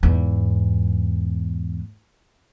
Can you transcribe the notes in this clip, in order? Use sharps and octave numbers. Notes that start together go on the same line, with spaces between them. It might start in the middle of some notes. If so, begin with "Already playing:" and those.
E2 G#2